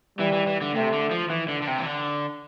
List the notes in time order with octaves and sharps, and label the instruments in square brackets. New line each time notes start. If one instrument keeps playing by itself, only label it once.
[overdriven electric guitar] E3 [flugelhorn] G3
[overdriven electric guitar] E3
E3
D3
[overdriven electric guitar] C3 [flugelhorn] A3
[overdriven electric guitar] D3
F3
E3
D3
D3
C3
E3
D3